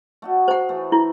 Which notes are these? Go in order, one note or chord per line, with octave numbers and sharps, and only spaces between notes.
A3 F#4 D#5
C5 F#5
E3 A3
E4